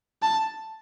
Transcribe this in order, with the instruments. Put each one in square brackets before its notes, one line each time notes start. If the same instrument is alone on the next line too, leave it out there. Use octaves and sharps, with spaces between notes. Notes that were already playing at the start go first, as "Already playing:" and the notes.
[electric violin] A5